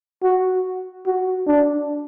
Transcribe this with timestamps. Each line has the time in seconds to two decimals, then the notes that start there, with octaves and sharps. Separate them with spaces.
0.23 F#4
1.06 F#4
1.47 D4